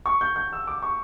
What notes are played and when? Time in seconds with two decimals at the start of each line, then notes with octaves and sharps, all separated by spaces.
0.06 C#6
0.21 G6
0.36 G6
0.53 E6
0.67 D6
0.83 C#6